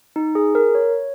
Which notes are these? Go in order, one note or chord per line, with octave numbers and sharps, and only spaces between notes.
D#4
G#4
A#4
C#5